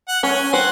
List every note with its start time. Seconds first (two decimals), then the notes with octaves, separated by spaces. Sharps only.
0.08 F#5
0.23 C#4 C#5 G#5
0.53 C4 C5 F#5